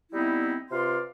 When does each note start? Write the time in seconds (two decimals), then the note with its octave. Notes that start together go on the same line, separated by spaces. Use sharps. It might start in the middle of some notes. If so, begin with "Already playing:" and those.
0.13 G3 B3 C4 D#4 E4
0.71 C3 F4 B4 D5 F5 C6